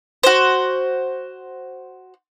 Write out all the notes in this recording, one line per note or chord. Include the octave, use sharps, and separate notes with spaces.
F#4 C5